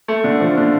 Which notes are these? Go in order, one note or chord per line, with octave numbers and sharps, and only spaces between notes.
A3
D3
F3
D3